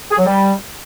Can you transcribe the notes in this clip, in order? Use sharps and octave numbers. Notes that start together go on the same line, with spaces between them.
G#4
F#3
G3